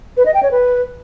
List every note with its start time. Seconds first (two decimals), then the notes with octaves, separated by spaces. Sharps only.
0.17 B4
0.26 D#5
0.34 G5
0.43 C#5
0.51 B4